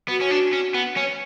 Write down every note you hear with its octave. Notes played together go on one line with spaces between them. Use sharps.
B3 F#4
C#4
D4
C#4
B3
C#4